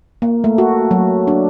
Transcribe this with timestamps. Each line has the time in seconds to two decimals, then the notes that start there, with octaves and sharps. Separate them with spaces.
0.22 A#3
0.44 A3
0.58 F#4
0.91 F#3
1.27 D4